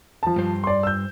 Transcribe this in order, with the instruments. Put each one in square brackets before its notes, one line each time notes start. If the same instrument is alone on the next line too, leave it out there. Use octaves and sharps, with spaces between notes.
[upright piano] F3 A5
[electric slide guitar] G2 C5
[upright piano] D5 C6
E6 G6